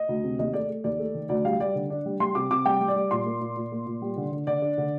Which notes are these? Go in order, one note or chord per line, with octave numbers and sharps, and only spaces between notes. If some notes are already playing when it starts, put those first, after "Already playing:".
Already playing: D#5
D2
C3
D#2 D#5
A3 D5
A3
D#2 D5
A3
D#3
D2 D5
G3 F5
G3 D5
D3
D4
G3
G3 C6
C3 D6
C3 D6
G3 G5
G3
D5
G3
A#2 C6
A#3
A#2
A#2
A#3
A#2
G3
D3
D3
D3 D5
D4
D3